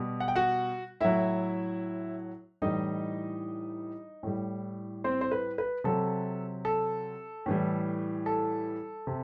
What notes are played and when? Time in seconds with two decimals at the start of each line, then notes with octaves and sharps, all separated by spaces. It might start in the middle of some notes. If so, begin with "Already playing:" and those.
Already playing: B2 G3
0.20 F#5
0.28 G5
0.36 F#4 F#5
1.01 A2 F#3 E4 E5
2.62 A2 E3 G3 D#4 D#5
4.23 A2 G3
5.04 C4 C5
5.21 C5
5.31 B4
5.58 B4
5.84 C3 F#3 A4
6.65 A4
7.46 A2 E3 G3
8.26 A4
9.07 C3